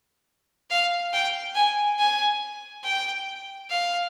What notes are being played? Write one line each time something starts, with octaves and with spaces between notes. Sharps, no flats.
F5
G5
G#5
G#5
G5
F5